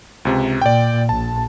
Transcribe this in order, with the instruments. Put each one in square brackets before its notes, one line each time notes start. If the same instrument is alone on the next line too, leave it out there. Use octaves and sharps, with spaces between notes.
[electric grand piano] C#2 C3
[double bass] A#2 [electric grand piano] D5 G5
[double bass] A#1 [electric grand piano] A5